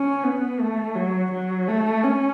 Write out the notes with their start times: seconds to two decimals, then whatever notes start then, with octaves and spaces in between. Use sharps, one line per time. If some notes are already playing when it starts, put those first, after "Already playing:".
Already playing: C#4
0.24 B3
0.60 A3
0.96 F#3
1.32 F#3
1.68 A3
2.04 C#4